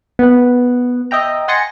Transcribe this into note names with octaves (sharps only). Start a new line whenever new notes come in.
B3 F#5
D#5 E5 G5 A#5
F#5 G#5 C6 A6 A#6 C#7